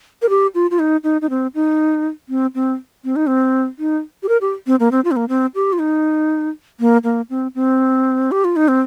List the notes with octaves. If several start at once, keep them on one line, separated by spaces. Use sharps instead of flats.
A#4
G4
F4
F4
D#4
D#4
D#4
C4
D#4
C4
C4
C4
D#4
C4
D#4
G4
A#4
G4
C4
A#3
C4
F4
C4
A#3
C4
G4
F4
D#4
A#3
A#3
C4
C4
G4
F4
D#4
C4